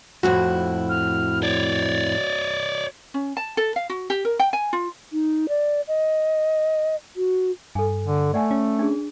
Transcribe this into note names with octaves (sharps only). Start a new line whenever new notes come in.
F2 A2 E4 F#4
F6
C#5 D5 A6
C#4
A5
A4
F5
F#4
G4
A#4
G5
G#5
F4
D#4
D5
D#5
F#4
G2 A4 G#5
D3
A3 D5 F#5 G#5
C#4
D4 G#4